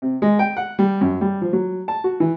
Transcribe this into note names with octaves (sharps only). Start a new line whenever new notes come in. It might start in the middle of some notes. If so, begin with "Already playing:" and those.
C3
G#3
G5
F#5
G3
F#2
G3
F3
F#3
A5
F#4
E3